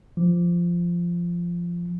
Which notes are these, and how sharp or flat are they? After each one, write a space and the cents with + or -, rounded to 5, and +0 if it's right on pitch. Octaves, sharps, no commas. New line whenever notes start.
F3 -10